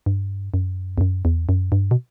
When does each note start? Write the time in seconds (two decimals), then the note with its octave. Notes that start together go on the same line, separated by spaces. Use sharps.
0.06 G2
0.54 F#2
0.98 E2
1.01 F#2
1.25 E2
1.49 F#2
1.72 G2
1.91 B2